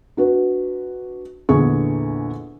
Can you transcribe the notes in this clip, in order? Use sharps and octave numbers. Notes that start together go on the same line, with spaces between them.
D4 F#4 B4
A#1 E2 D3 G#4 C#6